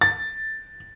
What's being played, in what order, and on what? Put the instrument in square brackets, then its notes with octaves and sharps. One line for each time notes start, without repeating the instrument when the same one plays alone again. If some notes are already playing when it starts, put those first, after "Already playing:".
[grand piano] A6